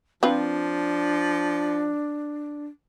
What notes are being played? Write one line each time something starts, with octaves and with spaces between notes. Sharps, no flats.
F3 C4 D4 F4 B4